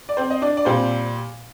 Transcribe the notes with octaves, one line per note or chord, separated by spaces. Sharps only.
D5
C4 C5
D#5
D4 D5
D5
A#2 G3 C4 C5